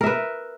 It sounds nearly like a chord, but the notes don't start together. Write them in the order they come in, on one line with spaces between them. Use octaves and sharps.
A#4 E5 B4